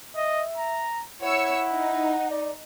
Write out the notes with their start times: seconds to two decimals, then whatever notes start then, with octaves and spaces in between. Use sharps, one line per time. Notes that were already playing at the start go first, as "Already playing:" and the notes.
0.16 D#5 E5
0.58 A#5
1.22 E4 C#5 F#5 E6 C#7
1.72 D#4
2.30 D5